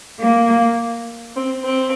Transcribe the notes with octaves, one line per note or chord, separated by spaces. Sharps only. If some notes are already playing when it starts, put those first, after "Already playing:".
A#3
C4
C4